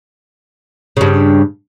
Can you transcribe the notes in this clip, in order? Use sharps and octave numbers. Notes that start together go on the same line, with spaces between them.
G2 C#3